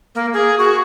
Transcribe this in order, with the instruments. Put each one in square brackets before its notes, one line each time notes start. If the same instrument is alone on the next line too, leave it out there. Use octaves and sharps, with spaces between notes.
[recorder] A#3
G#4
F#4